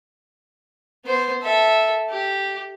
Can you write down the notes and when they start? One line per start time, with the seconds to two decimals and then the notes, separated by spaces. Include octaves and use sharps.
1.05 B3 C5
1.42 A4 E5
2.10 G4